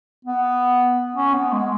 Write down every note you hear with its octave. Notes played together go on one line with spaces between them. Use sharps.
B3
C#4
B3
G#3